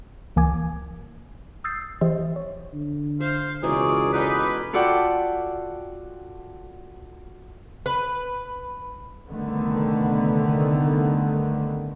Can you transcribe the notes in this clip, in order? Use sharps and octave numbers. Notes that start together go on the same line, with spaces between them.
C#2 E3 A#3 G#5 D6 G#6
D#6 E6 G6 A6 C7
E3 G4 C5 D#5 E5
C#5
D3
C5 E5 F5
C#2 B2 E3 G#4 A#4 C#5 D5
D3 C#4 D#4 B4 D5
F4 F#4 A4 D5 F#5 G5
B4
C2 D3 D#3 A3 B3